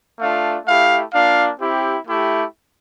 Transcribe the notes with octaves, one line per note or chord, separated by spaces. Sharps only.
A3 D4 F4 F5
A3 E4 G4 F5
A#3 D4 F4 F5
C4 E4 G4
A3 E4 G4